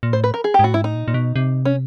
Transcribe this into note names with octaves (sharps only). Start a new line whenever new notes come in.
A#2
A2 C5
B4
A#4
G#4
G4
G#2
A2 F#4
G#2 E4
A2 D#4
A#2
A#2
B2
C3
C#4